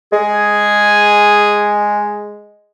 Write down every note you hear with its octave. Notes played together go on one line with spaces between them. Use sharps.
G#3 G#4